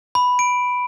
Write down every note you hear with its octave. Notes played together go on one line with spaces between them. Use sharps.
B5
D7